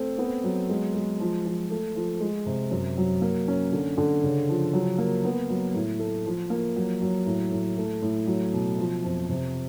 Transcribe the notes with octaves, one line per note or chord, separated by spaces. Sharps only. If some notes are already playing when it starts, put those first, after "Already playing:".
Already playing: A3 C4
B3
F#3
G#3
G#3
F3
F3
A3
F3
G#3
C3
F#2
F#3
A#3
C#4
D3
D3
C#3
F3
F#3
A#3
B3
F#3
A2
A3
F3
A#3
F#3
F#3
A2
A2
A3
A2
F#3
B2
F3
F2
C3